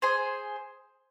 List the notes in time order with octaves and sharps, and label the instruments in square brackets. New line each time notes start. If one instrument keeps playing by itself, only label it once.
[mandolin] G#4 C5 G#5